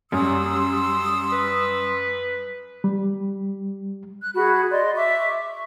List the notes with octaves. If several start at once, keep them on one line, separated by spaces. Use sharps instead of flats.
F#2 G3 C6 D#6 E6
B4
G3
F#6
F#4 G#4 B5
D5 D#5 C6
E5 C#6 D6
C#6